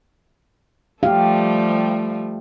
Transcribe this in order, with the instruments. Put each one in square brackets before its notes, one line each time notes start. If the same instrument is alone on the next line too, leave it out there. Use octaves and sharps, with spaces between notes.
[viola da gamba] F3 G3 A3 [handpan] G4 F5